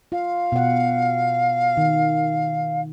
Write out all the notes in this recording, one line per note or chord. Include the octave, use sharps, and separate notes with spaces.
F4 F5
B2 F#5
D#3